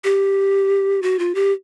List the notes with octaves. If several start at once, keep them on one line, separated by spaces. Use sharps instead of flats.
G4
F#4
F4
G4